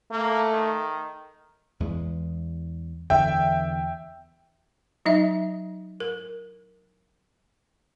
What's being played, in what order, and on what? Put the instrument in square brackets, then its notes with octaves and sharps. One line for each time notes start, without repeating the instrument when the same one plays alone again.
[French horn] A3 [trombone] A#3
[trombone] D#3
[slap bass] E2 G#3
[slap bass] E2 D3 [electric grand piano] E5 G5
[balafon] F#3 D#4 D#5 E5
A#4